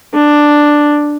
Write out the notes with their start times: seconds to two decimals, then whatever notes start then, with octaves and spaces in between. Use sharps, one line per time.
0.14 D4